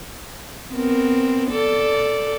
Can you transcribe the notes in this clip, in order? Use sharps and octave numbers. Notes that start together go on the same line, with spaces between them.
B3 C4 A#4
A4 D5